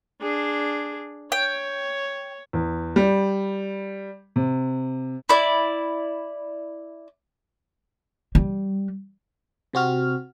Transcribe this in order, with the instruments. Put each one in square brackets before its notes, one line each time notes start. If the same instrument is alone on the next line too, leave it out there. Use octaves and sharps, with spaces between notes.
[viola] D4 G#4
[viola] C#5 [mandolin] G5
[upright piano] E2
G3
C3
[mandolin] E4 D5
[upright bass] G3
[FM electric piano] C3 C4 F#4 F6